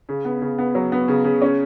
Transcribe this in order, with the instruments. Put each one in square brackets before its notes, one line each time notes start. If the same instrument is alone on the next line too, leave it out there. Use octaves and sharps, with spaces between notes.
[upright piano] C#3
B3
C#3
B3
F#3
B3
C#3
C#3
C#4